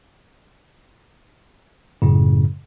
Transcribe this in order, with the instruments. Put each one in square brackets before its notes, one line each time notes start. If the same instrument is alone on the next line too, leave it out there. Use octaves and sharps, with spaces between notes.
[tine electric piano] F#2 A2 C#3